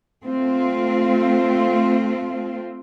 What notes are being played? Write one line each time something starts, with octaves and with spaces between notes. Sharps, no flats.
A3 C4 F4